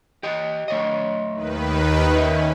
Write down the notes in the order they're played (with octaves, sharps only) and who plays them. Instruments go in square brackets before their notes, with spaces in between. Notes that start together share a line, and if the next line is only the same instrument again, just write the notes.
[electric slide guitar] G4 D#5
A3 C#5 D#5
[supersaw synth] D#2 D#3 B4
[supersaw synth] C#4 [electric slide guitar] D#4 E5